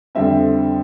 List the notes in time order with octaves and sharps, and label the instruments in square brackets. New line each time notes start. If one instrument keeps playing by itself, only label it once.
[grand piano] F2 D3 G3 C4 E5